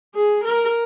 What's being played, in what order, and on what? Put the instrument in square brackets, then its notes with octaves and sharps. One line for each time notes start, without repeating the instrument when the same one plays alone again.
[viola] G#4
A#4